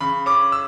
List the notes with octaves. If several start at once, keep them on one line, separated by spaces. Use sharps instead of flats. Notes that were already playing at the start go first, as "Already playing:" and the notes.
C#3 B5
C#4 D6
E6